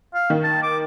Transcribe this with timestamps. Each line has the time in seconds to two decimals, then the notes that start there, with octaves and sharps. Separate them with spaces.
0.14 F5
0.30 D#3
0.44 A5
0.63 D6